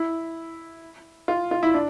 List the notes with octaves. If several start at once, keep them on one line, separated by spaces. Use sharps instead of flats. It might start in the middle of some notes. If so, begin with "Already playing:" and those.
Already playing: E4
F4
F4
E4
D4